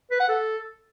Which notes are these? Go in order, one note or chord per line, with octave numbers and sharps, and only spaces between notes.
B4
F#5
A4